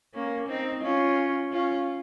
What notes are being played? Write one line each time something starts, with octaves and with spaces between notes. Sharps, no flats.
A#3 C#4
C4 D#4
C#4 F4
C#4 F4